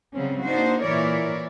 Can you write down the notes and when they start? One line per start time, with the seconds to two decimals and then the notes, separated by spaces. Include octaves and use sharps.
0.15 C#3 F#3 G3 C4 C#4
0.44 A#3 D4 D#4 F#4 C5
0.82 A#2 E3 E4 A#4 C#5 D5